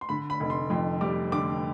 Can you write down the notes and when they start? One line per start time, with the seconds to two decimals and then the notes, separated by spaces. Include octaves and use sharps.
0.01 C6
0.09 D3 B5
0.30 B5
0.40 F1
0.50 C6
0.70 F2 C6
1.01 G3 D6
1.32 D3 D6